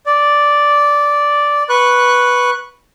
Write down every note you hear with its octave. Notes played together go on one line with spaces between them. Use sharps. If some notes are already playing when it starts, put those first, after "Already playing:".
D5
B4 C#6 F#6